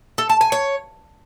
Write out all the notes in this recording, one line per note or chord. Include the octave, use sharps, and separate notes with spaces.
A4
A5
G#5
C#5